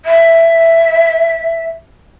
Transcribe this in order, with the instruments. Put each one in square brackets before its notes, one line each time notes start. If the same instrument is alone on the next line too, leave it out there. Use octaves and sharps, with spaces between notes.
[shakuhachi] E5